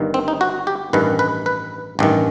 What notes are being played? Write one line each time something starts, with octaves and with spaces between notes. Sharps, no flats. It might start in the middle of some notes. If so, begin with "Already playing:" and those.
Already playing: G1 G2 D#3
C4
D#4
F#4
G4
A1 G2 D#3 B4
B4
B4
A1 G2 D#3